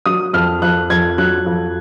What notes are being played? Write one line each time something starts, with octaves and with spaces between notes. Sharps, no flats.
F#3 D#6
F2 F6
F2 F#6
F2 G#6
F#3 F#6
F2